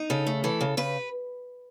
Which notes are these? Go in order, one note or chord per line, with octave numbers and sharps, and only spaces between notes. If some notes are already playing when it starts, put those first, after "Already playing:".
Already playing: D#4
C#3 A4
A3
E3 A4
C#3
C#3 B4